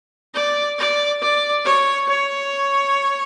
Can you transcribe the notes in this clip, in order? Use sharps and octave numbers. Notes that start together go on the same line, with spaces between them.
D5
D5
D5
C#5
C#5